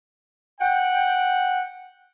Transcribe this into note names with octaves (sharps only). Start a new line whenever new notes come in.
F#5 G5